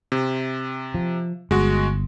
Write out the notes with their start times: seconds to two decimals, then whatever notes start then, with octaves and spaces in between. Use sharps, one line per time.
0.12 C3
0.94 F3
1.51 G1 G#3 F#4